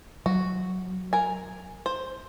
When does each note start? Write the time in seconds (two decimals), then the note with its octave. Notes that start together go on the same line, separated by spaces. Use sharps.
0.26 F#3 F#4
1.13 A#4 G#5
1.86 C5